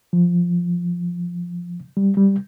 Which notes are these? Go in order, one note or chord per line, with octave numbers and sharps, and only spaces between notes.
F3
G3
G3